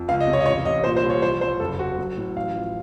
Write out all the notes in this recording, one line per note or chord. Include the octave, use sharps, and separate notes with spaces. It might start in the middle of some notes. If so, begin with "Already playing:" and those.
Already playing: F2
C#2 F5
D#5
C3
C#5
D#5
A1 C#5
A1 D#5
A#2 C5
C5
C2
C#5
F3 C5
C2 C5
F#1 A4
F#1 F#4
F#3
A2
A1 F5
F3